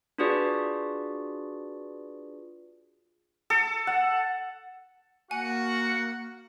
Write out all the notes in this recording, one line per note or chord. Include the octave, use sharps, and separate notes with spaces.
D4 F4 F#4 G#4 B4 D5
A4
F#5
A#3 F#4 F#5 G#5